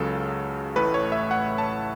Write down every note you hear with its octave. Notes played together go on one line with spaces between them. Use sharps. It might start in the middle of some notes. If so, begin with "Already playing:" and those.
Already playing: C#2 C#3 F#3 A4
A1 A2 A3 B4
C#5
E5
F#5
A5